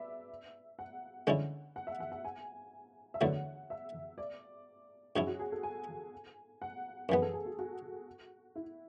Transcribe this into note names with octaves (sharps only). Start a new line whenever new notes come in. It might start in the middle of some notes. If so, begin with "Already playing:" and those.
Already playing: B4 D5 E5
F#5
D3 G#3 C#4 E4
F#5
E5
F#5
F#5
G#5
E5
E2 D3 F#3 A3 E4 F#5
E5
D5
G#2 F#3 C#4 E4 G#4
F#4
G#4
A4
G#5
F#5
F#2 E3 B3 G#4
A4
G#4
F#4
F#4
E4